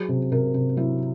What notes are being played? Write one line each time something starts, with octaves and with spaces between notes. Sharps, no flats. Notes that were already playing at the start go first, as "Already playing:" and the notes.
Already playing: F#3 G#4
C3
C3 A#4
C3
F#3 E4